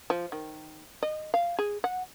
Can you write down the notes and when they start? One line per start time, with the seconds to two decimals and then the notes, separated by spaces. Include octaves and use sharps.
0.10 F3
0.32 D#3
1.03 D#5
1.34 F5
1.59 G#4
1.84 F#5